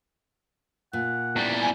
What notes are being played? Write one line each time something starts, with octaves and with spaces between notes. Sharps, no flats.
A#2 F#5
E2 G3
G#5